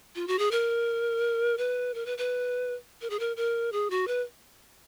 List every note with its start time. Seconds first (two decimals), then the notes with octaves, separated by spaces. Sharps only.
0.15 F4
0.27 F#4
0.39 G#4
0.51 A#4
1.58 B4
1.94 A#4
2.06 B4
2.18 B4
3.01 A#4
3.10 G#4
3.19 A#4
3.37 A#4
3.72 G#4
3.90 F#4
4.07 B4